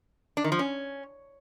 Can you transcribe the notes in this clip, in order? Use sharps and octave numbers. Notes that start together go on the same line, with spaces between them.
D4
D#3
F3
C#4